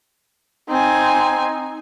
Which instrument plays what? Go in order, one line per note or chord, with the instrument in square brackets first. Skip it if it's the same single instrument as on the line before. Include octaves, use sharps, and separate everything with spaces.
[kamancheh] C4 G#5 [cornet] D#4